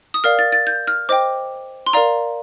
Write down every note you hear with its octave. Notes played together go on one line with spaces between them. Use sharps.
D#6
A#4 D5 F5 F6
A6
A6
G6
F6
C5 D#5 G5 D6
C6
A#4 D5 F5 A#5